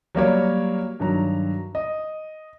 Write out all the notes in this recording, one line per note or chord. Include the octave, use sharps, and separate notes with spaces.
F#3 G3 A#3 C#5
G2 D#3 F#3 A#5
D#5